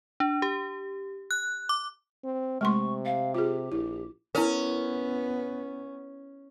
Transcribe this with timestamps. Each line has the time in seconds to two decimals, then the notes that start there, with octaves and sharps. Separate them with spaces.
0.20 D4
0.42 G4
1.31 F#6
1.69 D6
2.24 C4
2.61 C3 G#3 A3 C6 C#6
3.05 F5
3.35 F4 G4 G#4
3.72 A#1 E4
4.35 B3 C#4 E4 A#4